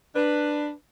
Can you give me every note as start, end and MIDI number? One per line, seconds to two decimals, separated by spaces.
0.14 0.70 62
0.14 0.70 71